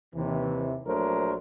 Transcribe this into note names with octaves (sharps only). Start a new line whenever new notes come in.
D#2 C3 E3
A#1 F#3 A3 D4 A#4 C5